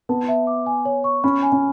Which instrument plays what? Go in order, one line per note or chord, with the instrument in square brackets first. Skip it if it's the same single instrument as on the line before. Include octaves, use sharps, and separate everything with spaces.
[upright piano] B3 [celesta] A5
[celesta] E5
D6
G#5
C#5
C#6
[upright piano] C#4 [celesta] B5
[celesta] G#5
[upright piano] C#4